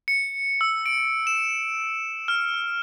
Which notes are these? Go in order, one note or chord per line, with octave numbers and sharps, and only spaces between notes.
C#7
E6
D7
E7
F6